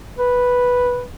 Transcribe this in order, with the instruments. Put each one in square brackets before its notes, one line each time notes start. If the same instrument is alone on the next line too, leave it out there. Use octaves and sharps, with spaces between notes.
[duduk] B4